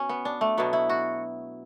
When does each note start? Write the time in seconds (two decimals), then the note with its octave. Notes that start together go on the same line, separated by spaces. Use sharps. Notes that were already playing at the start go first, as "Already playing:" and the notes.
Already playing: B2 C#4
0.09 B3
0.25 D4
0.41 A3
0.58 B2 F#3 B3
0.73 E4
0.89 F#4